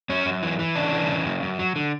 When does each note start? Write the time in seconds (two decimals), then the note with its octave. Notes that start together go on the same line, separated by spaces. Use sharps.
0.09 F#2 C#4
0.26 F#2
0.42 E3
0.59 E3
0.76 C#3 D4
0.93 E3
1.09 C#3
1.25 F#2
1.42 F#2
1.59 F#3
1.76 D3